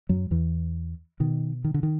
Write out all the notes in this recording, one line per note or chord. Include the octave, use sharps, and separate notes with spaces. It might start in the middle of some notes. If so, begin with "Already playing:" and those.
F#2 F#3
E2 E3
B2 D#3
D#3
D3
D#3